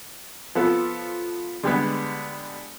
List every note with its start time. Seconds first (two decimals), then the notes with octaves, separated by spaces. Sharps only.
0.55 F3 B3 A4
1.63 D3 G3 G#3 B3